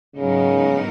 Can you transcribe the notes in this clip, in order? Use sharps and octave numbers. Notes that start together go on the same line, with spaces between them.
G#2 C#3 F#3 B3 D#4 A#4